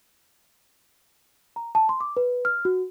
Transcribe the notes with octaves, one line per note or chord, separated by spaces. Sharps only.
A#5
A5
C6
D6
B4
F6
F#4